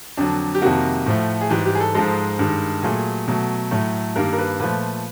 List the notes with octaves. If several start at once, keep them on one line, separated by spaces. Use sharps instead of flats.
F2 D3 F#3 D4
G4
F2 C3 D#3 G3 A#3 F#4
A2 F3 A3
G#4
G#2 E3 G3 G4
G4
G#4
A4
G#2 F3 G#3 A4
G2 D#3 G#3
A#2 F#3 A3 G#4
B2 F#3 A3
A2 F#3 A3
G2 D#3 G3 A#3 A#4
A#4
B4
A#2 F3 A3 B4